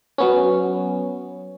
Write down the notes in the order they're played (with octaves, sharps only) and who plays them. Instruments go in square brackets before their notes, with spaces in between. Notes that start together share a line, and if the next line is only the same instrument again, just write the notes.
[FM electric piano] F#3 B3 C#4